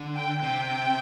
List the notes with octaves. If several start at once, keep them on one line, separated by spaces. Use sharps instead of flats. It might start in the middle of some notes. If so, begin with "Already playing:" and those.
Already playing: D3
G5
C3 G5